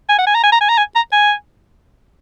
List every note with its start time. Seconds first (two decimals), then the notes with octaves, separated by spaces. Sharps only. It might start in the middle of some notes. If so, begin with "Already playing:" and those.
0.09 G#5
0.18 F#5
0.27 G#5
0.35 A#5
0.44 G#5
0.52 A#5
0.61 G#5
0.69 A#5
0.78 G#5
0.95 A#5
1.13 G#5